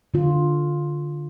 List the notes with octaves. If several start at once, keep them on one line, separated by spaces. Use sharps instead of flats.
D3 F4